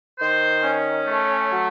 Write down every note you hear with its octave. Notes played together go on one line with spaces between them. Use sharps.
D#3 C5
C#4
A3
F#3